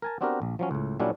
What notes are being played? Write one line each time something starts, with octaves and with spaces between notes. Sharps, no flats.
A#4 G#5 A5
B3 C4 D4 F#4 G4 A#4
A#1
F3 F#3 C#4
C#2 A2
A#2 F#3 G3 C#4 D4 E4